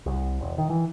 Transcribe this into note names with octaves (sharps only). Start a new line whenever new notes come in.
C2
E1
D#3
E3